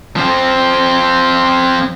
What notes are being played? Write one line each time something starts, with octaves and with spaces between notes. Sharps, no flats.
F3 C4